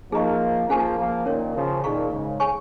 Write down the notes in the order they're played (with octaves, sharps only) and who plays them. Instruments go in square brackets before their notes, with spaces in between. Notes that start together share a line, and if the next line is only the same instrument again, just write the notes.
[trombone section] F3 A#3 [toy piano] D#4 G#4 D#5 A#5 C#6
[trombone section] F3 A#3 [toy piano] C#4 G#4 F5 G#5 C#6
[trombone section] F3 A#3
[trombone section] A#2 D#3 [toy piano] C#4 A#4 C#5
[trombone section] C#3 F3
[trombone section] A#2 D#3 [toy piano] D#4 G#4 F5 A#5 C#6
[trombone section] G#2 C#3
[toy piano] G#4 C#5 G#5 C#6